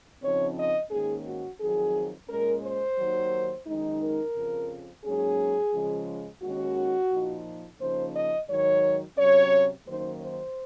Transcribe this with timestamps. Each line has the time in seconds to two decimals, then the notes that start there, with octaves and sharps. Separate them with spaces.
0.22 C#3 F3 C4 D#4 C#5
0.57 D#5
0.90 G#2 D#3 A#3 C#4 G#4
1.25 F#4
1.60 F2 D#3 F#3 C4 G#4
2.29 A#2 G#3 C#4 A#4
2.62 C5
2.97 D#2 D#3 F#3
3.66 F#2 D#3 G#3 D#4
4.01 A#4
4.35 F2 C#3 F3
5.04 G#2 F#3 A#3 C#4 G#4
5.73 C#3 F3 G#3
6.42 D#2 D#3 G#3 C#4 F#4
7.11 A#2 F3 A#3 D#4
7.80 C#3 F3 A#3 D#4 C5
8.15 D#5
8.48 G#2 D#3 F#3 C#5
9.18 C3 F#3 C#4 C#5
9.86 F#2 D#3 F#3 A#3 D#4 C5
10.21 C5